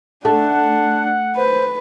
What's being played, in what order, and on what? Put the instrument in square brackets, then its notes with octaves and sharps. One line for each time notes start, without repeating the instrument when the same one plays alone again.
[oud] A3 [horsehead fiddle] D4 [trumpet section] F#5 [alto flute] A5
[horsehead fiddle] B4 [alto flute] C5